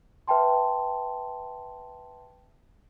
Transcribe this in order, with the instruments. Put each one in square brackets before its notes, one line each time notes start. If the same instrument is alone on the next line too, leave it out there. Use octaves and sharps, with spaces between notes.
[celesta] B4 E5 G5 A5 C6